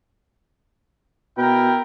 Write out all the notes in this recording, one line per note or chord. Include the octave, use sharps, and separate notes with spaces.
B2 E4 A#4 G5